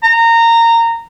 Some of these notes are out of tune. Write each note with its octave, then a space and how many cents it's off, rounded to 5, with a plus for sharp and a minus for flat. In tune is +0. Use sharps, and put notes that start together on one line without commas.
A#5 -20